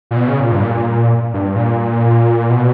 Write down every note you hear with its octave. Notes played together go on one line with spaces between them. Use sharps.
A#2
B2
C#3
A#2
G2
A#2
G2
A#2
B2